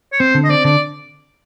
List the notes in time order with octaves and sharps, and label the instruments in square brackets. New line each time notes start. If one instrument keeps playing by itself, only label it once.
[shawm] C#5
[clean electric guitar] C4 [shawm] C5
[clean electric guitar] D3
[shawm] D#5
[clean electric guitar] C4 [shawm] D5
[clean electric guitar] D3 [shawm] D5